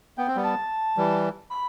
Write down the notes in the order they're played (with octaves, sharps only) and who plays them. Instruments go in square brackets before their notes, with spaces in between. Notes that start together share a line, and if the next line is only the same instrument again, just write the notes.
[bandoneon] B3 [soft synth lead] G5
[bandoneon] C4
G3 B3
[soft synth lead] A5
[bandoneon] E3 G3
[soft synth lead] B5